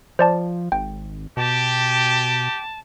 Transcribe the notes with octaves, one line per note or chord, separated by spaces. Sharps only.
F3 C5 D5 A5
G#1 G5
B2 G4 A5